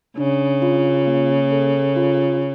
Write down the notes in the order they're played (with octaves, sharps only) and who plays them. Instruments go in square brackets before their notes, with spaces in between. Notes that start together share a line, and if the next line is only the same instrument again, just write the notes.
[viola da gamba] C#3 [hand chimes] D4
[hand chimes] F4
A#3
A4
F4